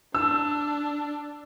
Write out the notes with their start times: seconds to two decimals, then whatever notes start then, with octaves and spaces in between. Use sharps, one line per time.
0.15 D4 E6